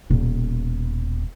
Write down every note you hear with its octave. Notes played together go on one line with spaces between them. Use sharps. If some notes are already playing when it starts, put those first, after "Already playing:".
D#1 B2